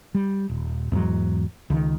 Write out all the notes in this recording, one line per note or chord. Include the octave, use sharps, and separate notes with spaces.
G3
D#1
E2 G#2 F#3
C#2 D#3